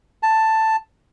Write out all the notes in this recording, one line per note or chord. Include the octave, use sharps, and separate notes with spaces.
A5